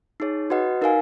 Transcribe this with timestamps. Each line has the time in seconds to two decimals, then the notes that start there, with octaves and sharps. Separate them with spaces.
0.20 D#4 G#4 C#5
0.50 F#4 B4 D#5 F#5
0.82 D#4 A#4 F5 G#5